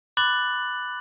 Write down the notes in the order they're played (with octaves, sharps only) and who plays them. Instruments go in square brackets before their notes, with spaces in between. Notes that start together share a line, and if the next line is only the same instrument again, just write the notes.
[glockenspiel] B5 D6 F#6 A6 F#7